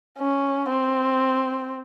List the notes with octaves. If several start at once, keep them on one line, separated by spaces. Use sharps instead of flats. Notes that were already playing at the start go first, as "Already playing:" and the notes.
C#4
C4